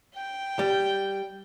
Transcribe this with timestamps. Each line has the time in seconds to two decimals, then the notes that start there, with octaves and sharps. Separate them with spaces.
0.14 G5
0.59 G3